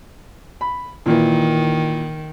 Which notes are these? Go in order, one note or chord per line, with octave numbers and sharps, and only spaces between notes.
B5
A#2 D#3 E3